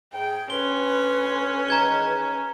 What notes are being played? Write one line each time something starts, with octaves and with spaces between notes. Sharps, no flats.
G#2 G#4 G5
D2 C#4 B4 C6 G7
D#3 E3 G#3 A#5 G#6 G7